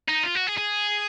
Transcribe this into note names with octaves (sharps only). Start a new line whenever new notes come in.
D#4
F4
F#4
G#4
G#4